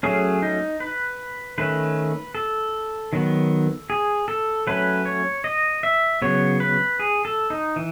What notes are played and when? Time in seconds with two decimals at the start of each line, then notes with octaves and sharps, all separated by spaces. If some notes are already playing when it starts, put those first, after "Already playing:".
0.03 F#3 A3 C#4 G#4
0.42 D#4
0.80 B4
1.58 D#3 A3 C#4 B4
2.35 A4
3.13 D#3 F#3 B3
3.90 G#4
4.28 A4
4.67 F#3 A3 C#4 B4
5.05 C#5
5.44 D#5
5.83 E5
6.22 C#3 F#3 B3 C#5
6.60 B4
6.99 G#4
7.25 A4
7.50 D#4
7.76 E3